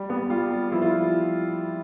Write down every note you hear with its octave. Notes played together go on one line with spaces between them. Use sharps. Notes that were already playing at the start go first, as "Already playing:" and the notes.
Already playing: G3
B3
G3 F4
G3
F3 E4
F4